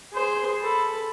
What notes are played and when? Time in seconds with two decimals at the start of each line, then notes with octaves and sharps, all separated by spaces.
0.12 G#4 C5
0.61 A4 B5